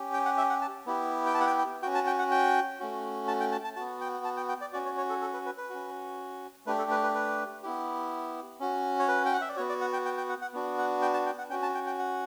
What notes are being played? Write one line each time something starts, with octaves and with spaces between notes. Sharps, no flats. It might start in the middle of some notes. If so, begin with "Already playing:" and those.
Already playing: C#4 G4
G5
F#5
E5
F#5
A5
B3 E4 G4
G5
A5
F#5
G5
G5
C#4 F#4 G5
A5
G5
F#5
G5
A3 C#4 F#4
A5
G5
A5
A5
B3 F#4 A5
G5
A5
G5
G5
D5
C#4 F#4 D5
C#5
C#5
A4
A4
B4
B4
B4
C#4 F#4
A3 D4 G4 B4
A4
B4
B4
B4
B3 E4 G4
C#4 F#4
C#5
B4
G5
F#5
E5
D5
B3 F#4 C#5
D5
F#5
G5
G5
G5
F#5
F#5
B3 D4 F#4
F#5
G5
A5
G5
F#5
C#4 F#4 G5
A5
G5
G5
F#5